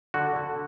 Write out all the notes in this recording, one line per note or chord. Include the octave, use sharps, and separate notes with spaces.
D3 F#4
D3